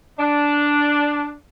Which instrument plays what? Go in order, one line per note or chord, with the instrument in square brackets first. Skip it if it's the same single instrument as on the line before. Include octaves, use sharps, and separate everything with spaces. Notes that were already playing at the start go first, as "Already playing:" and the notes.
[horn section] D4